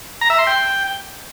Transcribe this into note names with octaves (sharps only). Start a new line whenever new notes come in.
A#5
E5
C6
G5